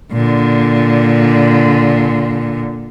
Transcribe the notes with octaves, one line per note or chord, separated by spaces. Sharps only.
A#2 D3